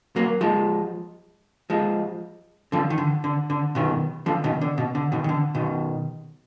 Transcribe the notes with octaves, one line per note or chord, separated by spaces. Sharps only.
F#3 A#3
F3 G#3
F3 G#3
D3 F3
D#3
D3
D3
D3
B2 D#3
D3 F3
B2 D#3
D3
B2
D3
B2 D#3
D#3
D3
B2 D#3